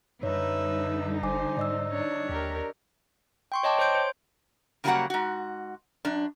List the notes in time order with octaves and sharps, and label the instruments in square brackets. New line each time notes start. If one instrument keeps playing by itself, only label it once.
[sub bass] F#2 [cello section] D3 G3 D#4 [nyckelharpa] B4 E5 [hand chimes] C#5
[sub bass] F#1 [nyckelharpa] C5 [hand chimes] G#5 D6
[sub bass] G#2 [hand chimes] D5 D#5 E6
[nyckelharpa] D4 C#5
[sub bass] D#2 [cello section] G4 A#4
[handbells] G5 C6 C#6
C#5 D#5 G5 A5 D6
C5 C#5 C6 G6 D7
C5
[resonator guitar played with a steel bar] C#3 F#3 G3 A#3 F#4 F#5
G#2 F#4
F#2 D4